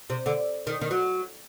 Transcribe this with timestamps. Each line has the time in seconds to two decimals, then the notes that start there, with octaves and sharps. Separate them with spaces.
0.10 C3
0.26 D3
0.67 D#3
0.81 D#3
0.91 F#3